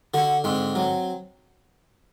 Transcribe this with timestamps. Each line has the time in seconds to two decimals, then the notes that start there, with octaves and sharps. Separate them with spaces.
0.14 D3 F#4
0.44 G#2 C4
0.75 F#3